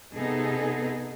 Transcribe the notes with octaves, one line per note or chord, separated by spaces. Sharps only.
C3 B3 D#4 G#4 A4